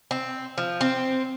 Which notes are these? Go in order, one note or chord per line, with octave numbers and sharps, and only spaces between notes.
C4
F3
C4